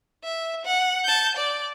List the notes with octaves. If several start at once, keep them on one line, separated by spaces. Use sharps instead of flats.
E5
F#5
A5 G6
D5